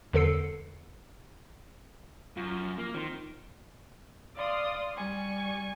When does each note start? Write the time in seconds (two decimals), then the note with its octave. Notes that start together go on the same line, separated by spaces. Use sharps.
0.13 E2 D3 A4 C7 C#7
2.37 F#2 F4
2.79 A#3
2.95 D#3 C4 C6
4.36 D5 F5 C6 D#6
4.96 G3 G#5 C#6